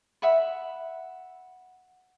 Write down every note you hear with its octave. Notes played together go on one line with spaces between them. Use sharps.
E5 F#5 B5